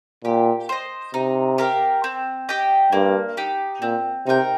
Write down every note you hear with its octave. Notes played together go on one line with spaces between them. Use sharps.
A#2 G4
C5 D#5
C3 D#4
G4 A#4 F5
C4
G4 D#5 G5
G2 A#3
D#4 G4
A#2 C4
C3 D#4 A#4 G5